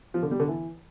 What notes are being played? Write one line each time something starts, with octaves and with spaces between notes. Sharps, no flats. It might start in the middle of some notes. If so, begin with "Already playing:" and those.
F3
D3
G3
D3
E3